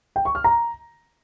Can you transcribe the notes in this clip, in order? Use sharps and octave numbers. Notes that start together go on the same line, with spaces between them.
G5
C#6
F6
A#5